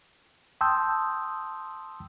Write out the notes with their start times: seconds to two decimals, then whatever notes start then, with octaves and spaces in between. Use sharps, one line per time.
0.61 G5 A5 C6 D#6 E6 G6